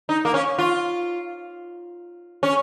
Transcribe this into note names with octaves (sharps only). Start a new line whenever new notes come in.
D#4
A#3
C#4
F4
C#4